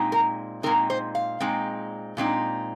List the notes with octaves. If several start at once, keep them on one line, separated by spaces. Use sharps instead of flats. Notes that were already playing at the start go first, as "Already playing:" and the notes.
Already playing: A#2 G#3 C4 D#4
A#4
A#2 G#3 C4 D#4 A#4
C5
F5
A#2 G#3 C4 D#4
A#2 G#3 C4 D#4